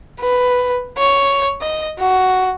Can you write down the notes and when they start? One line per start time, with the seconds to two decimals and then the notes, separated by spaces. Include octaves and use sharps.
0.21 B4
0.98 C#5
1.61 D#5
1.99 F#4